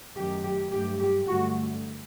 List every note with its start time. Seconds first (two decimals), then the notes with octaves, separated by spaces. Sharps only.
0.15 F#2 D#3 F#3 A3 G4
0.43 G4
0.71 G2 F#3 A3 G4
0.99 G4
1.27 G2 D3 A3 F#4